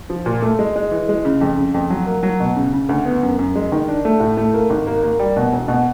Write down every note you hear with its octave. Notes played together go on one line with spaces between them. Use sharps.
F3
A#2
A3
G#3
G#3
E3
G#3
C#3
F2
C#3
F2
F#3
A#3
F#3
B2
C#3
C#3
D2
B3
F#2
F#2
G#3
D#3
D4
A3
A2
A3
A#3
G#1
A#3
A#3
G3
B2
E1
B2